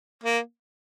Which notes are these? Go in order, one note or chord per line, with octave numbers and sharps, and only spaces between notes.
A#3